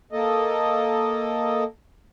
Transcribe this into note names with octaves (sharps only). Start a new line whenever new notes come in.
A#3 A4 D#5